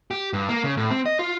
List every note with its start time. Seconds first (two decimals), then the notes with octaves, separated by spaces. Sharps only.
0.11 G4
0.33 G2
0.49 A#3
0.64 C#3
0.77 A2
0.91 C4
1.06 D#5
1.19 F4